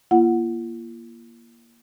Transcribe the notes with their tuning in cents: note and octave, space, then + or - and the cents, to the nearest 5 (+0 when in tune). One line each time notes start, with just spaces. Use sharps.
A#3 +15 F4 -45 F#5 +0